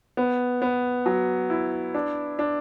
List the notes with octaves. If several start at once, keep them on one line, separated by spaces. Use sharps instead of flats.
B3
B3
F#3
E4
D4
D4